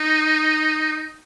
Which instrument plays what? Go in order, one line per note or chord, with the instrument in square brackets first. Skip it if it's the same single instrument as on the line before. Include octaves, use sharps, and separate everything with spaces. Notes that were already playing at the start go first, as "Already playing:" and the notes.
Already playing: [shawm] D#4